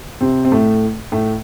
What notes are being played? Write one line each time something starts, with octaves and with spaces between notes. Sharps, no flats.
C3 C4
C4
A2 A3
A2 A3